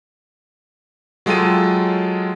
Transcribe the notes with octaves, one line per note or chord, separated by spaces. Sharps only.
F#3 G#3 F4 A4 G5 D#7